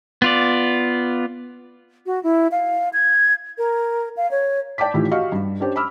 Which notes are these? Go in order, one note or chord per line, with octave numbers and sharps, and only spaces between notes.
B3 F4 D5
F#4
E4
F5
G#6
A#4
F5
C#5
D5 G5 A5 D6 B6
A2 D#3 E3 F4 G4
F#4 G4 D#5 F5 C#6
G2
C#4 D4 G4 C5
B5 D6 E6 F6